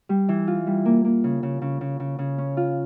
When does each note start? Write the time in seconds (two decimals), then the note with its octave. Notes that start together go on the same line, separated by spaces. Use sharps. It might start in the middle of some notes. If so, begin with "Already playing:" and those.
0.09 G3
0.29 E3
0.47 F4
0.67 G3
0.85 A#3
1.05 A#3
1.24 C#3
1.43 C#3
1.62 C#3
1.81 C#3
2.00 C#3
2.19 C#3
2.38 C#4
2.57 F4